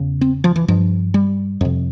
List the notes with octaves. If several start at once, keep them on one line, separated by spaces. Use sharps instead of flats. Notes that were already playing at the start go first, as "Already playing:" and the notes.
Already playing: E2 C#3
C4
F3
E3
G2 F3
G3
F2 C3